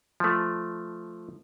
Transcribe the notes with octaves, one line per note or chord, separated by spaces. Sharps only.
F3 A3